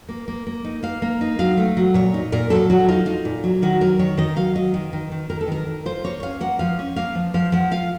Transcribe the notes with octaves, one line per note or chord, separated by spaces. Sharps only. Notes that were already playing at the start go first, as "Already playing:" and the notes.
A#3
A#3
A#3
D#4
A#3 F5
A#3
D#4
F#3 F5
A3
F#3
A#2 C#5
D#4
A#2 A#4
F#3 A4
F#3 F#4
D#4 F4
D#4 F4
A#2
F#3
D#3 F#4
F#3 A#4
D#3 C#5
D#3 D#5
F#3 F5
F#3 D#5
D#3
D#3
D#3
D#3 A#4
A4
D#3 A#4
D#3
F4 C5
A#3 C#5
C#4 F5
A#3 F#5
F3 F5
C#4
A#3 F5
F3
F3 F5
F3 F#5
F4 F5